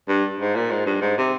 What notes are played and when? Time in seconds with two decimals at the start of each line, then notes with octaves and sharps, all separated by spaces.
0.08 G2
0.40 G#2
0.55 A#2
0.71 G#2
0.86 G2
1.01 G#2
1.18 C3